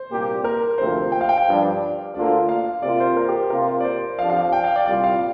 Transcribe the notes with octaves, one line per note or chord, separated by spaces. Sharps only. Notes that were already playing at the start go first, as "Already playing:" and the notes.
Already playing: C5
C2 A#2 A#3 G4
A#4
D2 C3 F3 A#3 C5
G5
F5
G5
F5
G2 F3 D4
D2 D3 A#3 F4 D5
F5
C3 A#3 F4 D5
C5
A#4
G4
C3 A#3 F4 A#4
D5
C5
F2 F3 D4 G4 F5
F5
F5
G5
F5
D5
C2 A#2 G3 A#3 F4 D5
F5